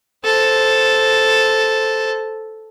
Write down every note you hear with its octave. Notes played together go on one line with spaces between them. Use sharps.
A4 C5